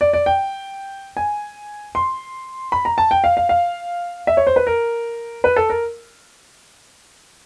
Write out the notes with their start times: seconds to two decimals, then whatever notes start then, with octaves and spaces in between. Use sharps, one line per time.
0.01 D5
0.13 D5
0.26 G5
1.17 G#5
1.95 C6
2.72 B5
2.85 A#5
2.98 A5
3.11 G5
3.24 F5
3.37 F5
3.49 F5
4.27 E5
4.37 C#5
4.47 C5
4.56 B4
4.67 A#4
5.44 B4
5.56 A4
5.70 A#4